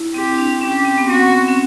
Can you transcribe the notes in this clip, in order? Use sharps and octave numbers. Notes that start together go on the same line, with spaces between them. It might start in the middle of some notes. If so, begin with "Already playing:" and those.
Already playing: E4
C4 G4
D4
C#4 G4
C4
B3
C4 F#4
C#4